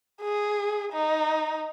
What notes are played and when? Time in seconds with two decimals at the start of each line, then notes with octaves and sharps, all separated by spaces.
0.21 G#4
0.92 D#4